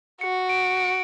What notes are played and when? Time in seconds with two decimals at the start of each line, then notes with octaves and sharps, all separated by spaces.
0.21 F#4 C#7
0.49 D7
0.77 D7